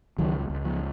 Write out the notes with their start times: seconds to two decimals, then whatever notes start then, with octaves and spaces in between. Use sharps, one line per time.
0.18 C#2 D#3 F#3
0.50 C#2
0.65 F3